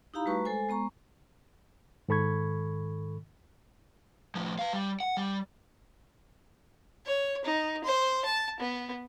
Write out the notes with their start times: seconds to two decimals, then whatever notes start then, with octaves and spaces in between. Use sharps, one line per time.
0.14 D#4 E4 G4 F5 A#5 B5
0.26 G3 A3 F#4 B4 A#5 C#6
0.45 G#3 A4 C5 G#5
0.69 G#3 B3 A#5 C#6
2.09 G#2 D#3 A4 B5 C#6 G#6
4.35 A2 F3
4.59 B4 F5
4.73 G3
5.00 F#5
5.17 G3
7.06 C#5
7.45 D#4
7.84 C5
8.25 A5
8.60 B3